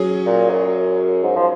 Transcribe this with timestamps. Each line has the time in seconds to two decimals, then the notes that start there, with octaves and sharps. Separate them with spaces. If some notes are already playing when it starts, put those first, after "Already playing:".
Already playing: F#3 C#4 G#4
0.26 A#2
0.50 F#2
1.23 G#2
1.36 F3